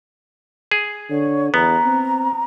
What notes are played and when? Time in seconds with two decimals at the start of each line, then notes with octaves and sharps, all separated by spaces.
0.71 G#4
1.10 D3 C#5
1.54 E2 B3 A#5
1.86 C4